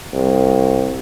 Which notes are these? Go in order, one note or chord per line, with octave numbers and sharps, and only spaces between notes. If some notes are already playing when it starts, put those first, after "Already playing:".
C2